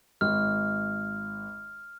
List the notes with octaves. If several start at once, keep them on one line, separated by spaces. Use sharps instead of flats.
G#1 F6